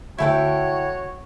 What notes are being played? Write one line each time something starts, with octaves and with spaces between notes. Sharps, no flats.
D2 E4 F#4 A4 C#5 G5 G#6